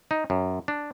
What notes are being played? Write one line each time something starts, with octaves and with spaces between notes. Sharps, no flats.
D#4
F#2
D4